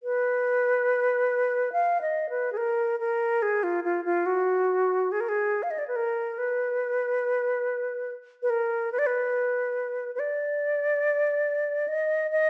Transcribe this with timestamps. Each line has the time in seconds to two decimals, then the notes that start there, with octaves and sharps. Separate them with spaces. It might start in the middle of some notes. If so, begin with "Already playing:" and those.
0.03 B4
1.72 F5
2.01 D#5
2.30 B4
2.53 G#4
2.57 A#4
3.00 A#4
3.42 G#4
3.63 F4
3.84 F4
4.05 F4
4.26 F#4
5.12 G#4
5.20 A#4
5.29 G#4
5.63 F5
5.71 D#5
5.78 D5
5.88 B4
5.96 A#4
6.38 B4
8.43 B4
8.50 A#4
8.92 B4
8.99 D5
9.07 B4
10.15 B4
10.19 D5
11.88 D#5
12.31 D#5